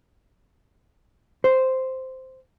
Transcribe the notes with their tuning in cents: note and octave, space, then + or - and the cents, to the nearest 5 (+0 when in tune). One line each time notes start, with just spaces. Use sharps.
C5 -5